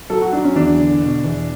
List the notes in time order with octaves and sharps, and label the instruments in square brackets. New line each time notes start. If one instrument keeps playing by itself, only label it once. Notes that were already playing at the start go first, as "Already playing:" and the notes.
[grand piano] F#3 A4
F#4
F#3 D4
C#4
E2 D4
D3
B2
E2